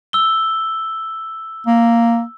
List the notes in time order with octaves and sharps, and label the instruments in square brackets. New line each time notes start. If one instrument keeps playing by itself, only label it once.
[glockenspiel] E6 G7
[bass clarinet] A#3